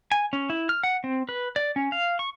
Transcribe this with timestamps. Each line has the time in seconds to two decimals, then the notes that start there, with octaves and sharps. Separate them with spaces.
0.12 G#5
0.33 C#4
0.50 E4
0.69 F6
0.83 F#5
1.04 C4
1.29 B4
1.56 D5
1.76 C#4
1.92 F5
2.19 C#6